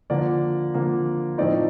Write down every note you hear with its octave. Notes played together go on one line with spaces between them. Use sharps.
D3 F3 A#3 D5
D3 F3 A#3
A2 F3 A3 C4 D#4 D5